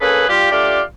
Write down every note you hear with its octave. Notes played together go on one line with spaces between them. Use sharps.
A#3 C#4 G#4 A4 B4
G3 F4 G4
A3 D4 F4 G4 D5 F5